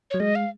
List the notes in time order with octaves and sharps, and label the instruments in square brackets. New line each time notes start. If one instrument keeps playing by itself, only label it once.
[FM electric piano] F#3 [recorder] C#5
[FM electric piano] G#3 [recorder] D#5
[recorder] F5